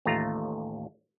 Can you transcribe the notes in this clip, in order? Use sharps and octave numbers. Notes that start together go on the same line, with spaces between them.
A1 D#2 A3 F4 A#5